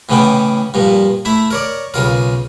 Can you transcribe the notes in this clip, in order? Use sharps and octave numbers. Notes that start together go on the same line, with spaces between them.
A2 C#3 E3 B3 C#4 G5
G2 A#2 F3
A3 E4 E5
A#4 C#5 D5
B1 C#3 F4 A#4